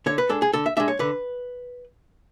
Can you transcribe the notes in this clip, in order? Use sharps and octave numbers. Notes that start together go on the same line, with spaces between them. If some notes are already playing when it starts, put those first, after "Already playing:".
D3 C#5
B4
G#3 D4 A4
G#4
D3 A4
E5
G#3 D4 E5
C#5
D3 B4